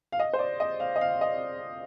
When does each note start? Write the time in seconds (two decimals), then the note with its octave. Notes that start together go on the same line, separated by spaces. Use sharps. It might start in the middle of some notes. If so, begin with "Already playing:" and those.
0.12 F5
0.20 D#5
0.33 C5
0.39 D5
0.60 D#5
0.80 F5
0.96 D#5
1.01 F5
1.21 D#5